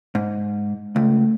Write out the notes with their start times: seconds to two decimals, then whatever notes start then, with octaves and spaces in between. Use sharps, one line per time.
0.15 G#2
0.96 C#2 A3